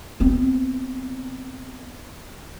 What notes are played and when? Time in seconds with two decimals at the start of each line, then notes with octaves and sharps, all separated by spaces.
0.20 B3 C4